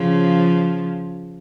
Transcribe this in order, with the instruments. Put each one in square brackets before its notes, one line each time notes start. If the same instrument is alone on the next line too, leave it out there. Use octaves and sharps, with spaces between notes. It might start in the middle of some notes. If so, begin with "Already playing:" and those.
Already playing: [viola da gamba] C#3 F3